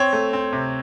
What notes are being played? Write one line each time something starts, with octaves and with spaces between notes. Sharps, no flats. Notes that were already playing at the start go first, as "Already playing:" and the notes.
Already playing: C4 C#5
A3
C4
C3